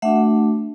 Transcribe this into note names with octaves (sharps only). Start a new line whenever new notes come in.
A3 D4 F#4 E5 F#5